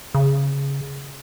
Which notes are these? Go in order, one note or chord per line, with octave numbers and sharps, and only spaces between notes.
C#3